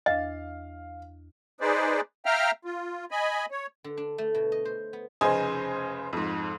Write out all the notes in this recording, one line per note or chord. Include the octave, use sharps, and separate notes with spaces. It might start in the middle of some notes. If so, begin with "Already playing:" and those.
E2 D4 D#5 F5
D#4 G#4 B4 C5 D5
E5 F5 G5 A#5 F6
F4
D#5 G#5 B5
C#5
D3
D4
A3
B2
D#5
C5
B3
F1 C#3 C5 D#5 G#5
F2 G#2